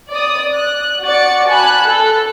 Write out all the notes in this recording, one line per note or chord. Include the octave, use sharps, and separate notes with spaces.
D5 D#6
F#6
F#4 D5 A6 C#7
G#5 A5 B5 F#6
A4